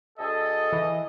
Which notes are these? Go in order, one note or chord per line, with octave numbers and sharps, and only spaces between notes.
D2 G#4 A4 D#5
E3